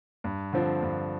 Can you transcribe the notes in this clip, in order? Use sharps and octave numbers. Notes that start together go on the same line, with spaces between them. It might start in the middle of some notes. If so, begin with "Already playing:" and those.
G2
D3 F3 C4
G2